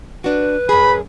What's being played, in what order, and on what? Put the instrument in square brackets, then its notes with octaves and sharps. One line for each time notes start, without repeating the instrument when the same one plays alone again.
[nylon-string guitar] D4 F#4 [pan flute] B4
[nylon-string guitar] F#2 G#4 [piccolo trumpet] B5